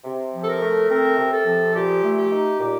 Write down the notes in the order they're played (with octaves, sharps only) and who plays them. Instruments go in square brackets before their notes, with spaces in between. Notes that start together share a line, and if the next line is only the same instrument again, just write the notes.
[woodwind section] C3
F3
A4
A#4
A3
C4 A#4
C3
A4
F3
A#2 G4
A3
G4
D#4
A#2 G4